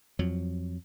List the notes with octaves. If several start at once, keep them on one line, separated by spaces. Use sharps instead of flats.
F2 F#3